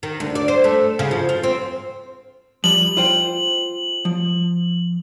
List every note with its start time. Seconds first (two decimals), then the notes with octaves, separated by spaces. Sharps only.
0.03 D#3
0.20 D2
0.35 D5
0.48 C5
0.64 A3
0.99 C#3
1.11 F3
1.29 F4
1.43 C4
2.64 F3 G3 F#7
2.97 F4 C5 G5
4.05 F3